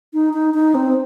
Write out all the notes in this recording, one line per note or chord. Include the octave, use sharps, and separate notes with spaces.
D#4
D#4
D#4
C4